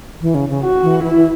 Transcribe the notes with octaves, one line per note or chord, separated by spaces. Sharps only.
E3
C#3
C#3
F#4
E3
E3 E4
E3